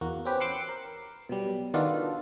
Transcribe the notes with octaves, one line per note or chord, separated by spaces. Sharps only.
E2 A#3 F#4
C4 C#4 G4 B4
C6 D6 E6 F#6 C7 C#7
A#4
B2 F#3 G3
D#3 B3 D4 F4 F#4 A4